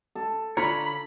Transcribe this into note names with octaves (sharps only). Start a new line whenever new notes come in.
A4
D3 F4 C#5 A#5 B5